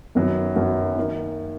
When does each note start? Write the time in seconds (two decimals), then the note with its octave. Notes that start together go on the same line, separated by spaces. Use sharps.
0.15 F#2 D#3 F#3 B3
0.56 F#2 D#3 F#3 B3
0.96 D#3 A#3 D#4 A#4